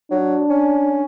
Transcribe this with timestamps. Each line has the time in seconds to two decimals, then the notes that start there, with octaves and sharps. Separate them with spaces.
0.11 F#3 D4
0.50 C#4